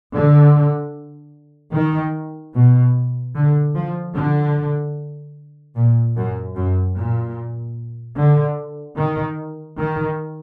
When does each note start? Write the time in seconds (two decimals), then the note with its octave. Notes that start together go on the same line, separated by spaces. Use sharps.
0.14 D3
1.74 D#3
2.54 B2
3.36 D3
3.75 F3
4.15 D3
5.76 A#2
6.17 F#2
6.56 F#2
6.97 A#2
8.16 D3
8.97 D#3
9.78 D#3